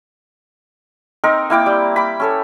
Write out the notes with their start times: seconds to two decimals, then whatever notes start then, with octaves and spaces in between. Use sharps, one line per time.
1.24 C4 D#4 A#4
1.50 A#3 E4 G5 D6
1.66 G3
1.96 B5 D6
2.20 C#4 A4 C#5